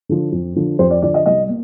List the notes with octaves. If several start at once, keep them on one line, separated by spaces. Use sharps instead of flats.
D3 F3
F2
D3 F3
F2 C5
D5
D3 F3 D5
D#5
C2 D#5
A#3